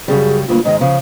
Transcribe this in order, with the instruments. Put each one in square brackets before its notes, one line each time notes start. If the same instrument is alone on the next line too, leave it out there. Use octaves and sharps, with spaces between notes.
[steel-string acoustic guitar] F#2 C#3 G3 [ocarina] G#4
[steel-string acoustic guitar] D2 G2 A#3 [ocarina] F4
[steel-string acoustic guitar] G#2 D#3 G#3 [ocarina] D#5
[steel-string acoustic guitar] C#3 F3 [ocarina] F5